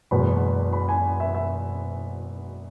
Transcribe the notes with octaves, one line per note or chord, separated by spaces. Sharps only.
F#1 E2 B2 G#3 B3 B5
B5
G#5
E5
E5